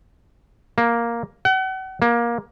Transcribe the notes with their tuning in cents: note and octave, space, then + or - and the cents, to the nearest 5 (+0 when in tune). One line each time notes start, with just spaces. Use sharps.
A#3 +5
F#5 +40
A#3 +20